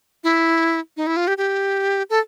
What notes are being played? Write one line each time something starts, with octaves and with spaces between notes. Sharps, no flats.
E4
D#4
E4
F4
G4
G4
A4